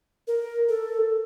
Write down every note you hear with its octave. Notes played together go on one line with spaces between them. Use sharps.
A#4
A4